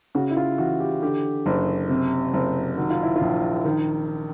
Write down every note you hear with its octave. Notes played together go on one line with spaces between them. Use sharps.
C#3 F#4
E4
F4
E3 F#4
G4
D3 G4
F#1
C3
F#1
D#3 F#4
F4
E4
F4
A#1
D#3